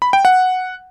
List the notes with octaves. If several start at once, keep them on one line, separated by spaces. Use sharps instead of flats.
B5
G5
F#5